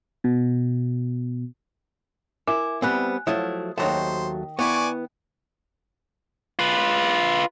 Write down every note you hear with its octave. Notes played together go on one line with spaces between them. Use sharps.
B2
E4 A#4 G#5 D6
G3 B3 C4 G#5 F#6
F3 F#3 A3 E4 D#6
D#2 D#3 E3 F#3 A3 C5 A5
B3 E4 D5 G#5 C#6
F4 B4